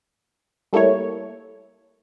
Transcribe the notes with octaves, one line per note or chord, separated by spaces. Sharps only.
G3 A3 A#3 E4 C#5